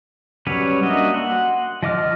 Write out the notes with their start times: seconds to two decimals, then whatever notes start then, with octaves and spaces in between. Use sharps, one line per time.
0.47 F#3 G3 C#4 B4 C#5
0.83 A#3 D4 F#4 D#5 E5
1.14 F#5 C6
1.83 F3 D#5 D6 F6